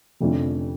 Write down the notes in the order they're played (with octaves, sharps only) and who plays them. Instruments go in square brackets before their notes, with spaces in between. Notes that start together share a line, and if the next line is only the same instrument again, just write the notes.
[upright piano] F1 F2 D3 A3 C#4